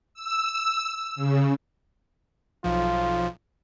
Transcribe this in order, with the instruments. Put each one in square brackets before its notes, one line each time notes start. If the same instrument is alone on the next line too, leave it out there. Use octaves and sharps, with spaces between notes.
[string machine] E6
C#3
[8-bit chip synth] B1 F3 [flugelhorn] F4